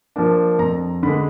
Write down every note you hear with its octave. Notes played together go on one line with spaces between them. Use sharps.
F3 A#3 D4
F2 A#5
D3 G#3 B5